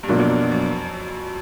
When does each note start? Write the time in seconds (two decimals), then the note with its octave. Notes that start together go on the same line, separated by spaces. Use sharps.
0.03 G2
0.08 F#2 B2 F#3 A#3 D4 F4
0.20 F2
0.30 F#2
0.41 F#2
0.52 F#2